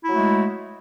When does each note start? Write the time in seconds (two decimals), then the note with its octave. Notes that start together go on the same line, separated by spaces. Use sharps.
0.03 E4
0.08 F#3
0.13 A3
0.18 G#3